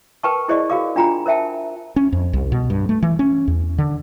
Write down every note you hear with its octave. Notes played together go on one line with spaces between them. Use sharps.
A#4 B4 G5 A5 C#6
E4 G#4 C5 D5 D#5 C#6
F#4 G#4 A#4 F5 D6
D4 F4 G5 G#5 A#5 B5
A#4 C5 E5 G5 A5
C#4
F2
C2
B2
G2
A3
E3
C#4
E2
D3